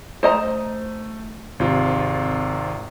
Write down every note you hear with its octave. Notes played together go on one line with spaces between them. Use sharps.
A3 C5 D#5 A#5
G#1 C3 F4